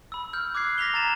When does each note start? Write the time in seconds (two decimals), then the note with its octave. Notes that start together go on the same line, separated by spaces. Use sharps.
0.12 B5 E6
0.33 F6 G6
0.55 D6 F#6 G#6 C7
0.78 A#6 B6 F7 G7
0.94 A#5 A6 E7